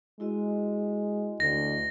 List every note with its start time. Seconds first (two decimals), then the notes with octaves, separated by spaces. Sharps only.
0.20 G#3 E4 F#4 D#5
1.40 D2 A#6